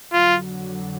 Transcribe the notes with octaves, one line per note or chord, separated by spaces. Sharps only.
F2 D3 F#3 F4